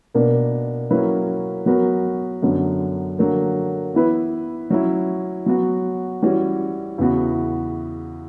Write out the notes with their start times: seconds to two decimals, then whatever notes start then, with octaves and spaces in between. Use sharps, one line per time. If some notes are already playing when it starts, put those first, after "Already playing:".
0.14 B2 A#3 D4 A#4
0.90 F#3 A#3 C#4 E4 B4
1.66 F#3 B3 F#4 A#4
2.42 F#2 D3 F#3 B3
3.18 D3 F#3 A#3
3.94 E3 B3 E4 B4
4.70 F#3 C#4 E4
5.46 F#3 B3 F#4
6.22 E3 G3 C#4 F#4
6.98 E2 C#3 E3 B3 F#4